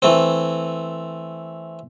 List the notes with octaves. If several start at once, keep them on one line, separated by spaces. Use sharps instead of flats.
E3 A3 C4